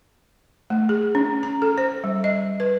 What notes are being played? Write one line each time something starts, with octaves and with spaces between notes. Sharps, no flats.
A3
G#4
C#4
A#5
A4
C5
G3
D#5
B4